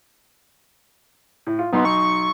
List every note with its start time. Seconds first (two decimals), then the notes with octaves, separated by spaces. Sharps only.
1.47 A2
1.59 F4
1.73 B1 B3 D#4 C6
1.85 C#6